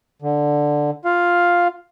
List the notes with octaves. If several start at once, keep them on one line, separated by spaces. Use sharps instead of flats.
D3
F4 F5